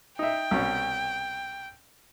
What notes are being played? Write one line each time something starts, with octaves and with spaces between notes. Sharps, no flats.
D#4 E5 G5
C2 B2 C#4